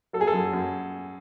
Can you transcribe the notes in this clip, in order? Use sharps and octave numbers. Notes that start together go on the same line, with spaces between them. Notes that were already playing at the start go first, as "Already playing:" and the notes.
F#3 A4
G#4
A4
F#2
F#2